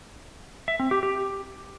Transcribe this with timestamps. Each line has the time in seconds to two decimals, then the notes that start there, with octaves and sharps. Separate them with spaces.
0.68 E5
0.80 C4
0.91 G4
1.03 G4